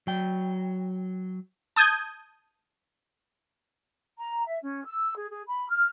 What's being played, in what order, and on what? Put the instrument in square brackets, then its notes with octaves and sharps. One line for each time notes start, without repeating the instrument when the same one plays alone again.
[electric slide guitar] F#3 G5
[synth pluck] A5 D#6 G6 G#6
[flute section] A#5
E5
C#4
E6
G#4
G#4
B5
F6